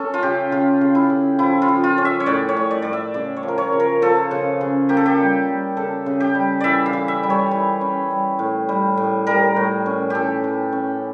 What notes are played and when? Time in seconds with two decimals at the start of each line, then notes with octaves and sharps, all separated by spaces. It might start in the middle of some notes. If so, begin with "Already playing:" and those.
Already playing: C#4 A4
0.14 F4
0.23 C#3 G4
0.51 C#3 F4
0.81 C#3
0.95 E4
1.10 C#3
1.39 F3 E4
1.62 F4
1.68 F3
1.84 F4
1.98 C#4
2.05 E5
2.20 C#5
2.26 A2 D5
2.49 C#5
2.57 A2
2.71 D5
2.82 A2 D5
2.93 E5
3.14 C#3 D5
3.36 C#5
3.43 F3
3.48 A#4
3.58 C#5
3.73 C#3
3.80 A#4
4.02 F3 A4
4.31 C#3
4.61 C#3
4.89 A#3 G4
4.97 A4
5.06 G4
5.19 G3
5.48 G3
5.77 C#3 A4
6.06 C#3
6.20 G4
6.35 G3
6.60 E3 D5 E5
6.86 F5
6.93 E3
7.08 E5
7.23 G3
7.30 C#5
7.51 E3
7.81 C#4
8.11 G3
8.39 A2
8.69 G3
8.97 A2
9.27 G3 A#4
9.56 A2
9.86 C#4
10.10 E3 G4 A4
10.44 E3
10.73 C#4